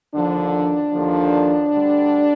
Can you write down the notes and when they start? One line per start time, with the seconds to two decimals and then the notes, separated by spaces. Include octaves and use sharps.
0.14 D#2 D3 F3 D4
0.93 D#2 D3 F3
1.70 D2 D3 G3